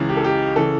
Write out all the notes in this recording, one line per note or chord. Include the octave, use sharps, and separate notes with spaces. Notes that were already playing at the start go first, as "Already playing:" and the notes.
Already playing: C#2 C#3 E3
G4
A4
G4
C#3 E3 A4